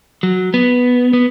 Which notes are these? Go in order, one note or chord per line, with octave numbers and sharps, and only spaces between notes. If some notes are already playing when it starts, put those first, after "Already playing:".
F#3
B3
B3